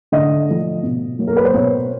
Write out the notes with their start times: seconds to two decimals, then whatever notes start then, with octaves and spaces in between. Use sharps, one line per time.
0.12 D3 D#5
0.48 F3 A3
0.83 B2
1.19 F#3 A#3
1.27 A#4
1.37 B4
1.45 C5
1.54 B2 C#5